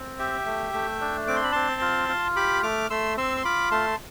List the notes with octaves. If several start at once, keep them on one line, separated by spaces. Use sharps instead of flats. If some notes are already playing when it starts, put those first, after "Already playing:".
Already playing: C4
G4 E5 G5
A3
A3
D4
C4 D6
C6
B5
C4 A5 C6
F4
F4
G4 B5 D6
A3 D6 F6
A3 C6 E6
C4 C6 E6
C6
F4 B5 D6
A3 A5 C6